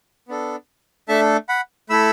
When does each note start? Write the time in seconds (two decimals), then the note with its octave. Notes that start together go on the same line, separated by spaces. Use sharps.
0.28 B3 D4 A4
1.08 A3 D4 A4 E5 A5
1.49 F#5 B5
1.89 A3 E4 A4 B5 E6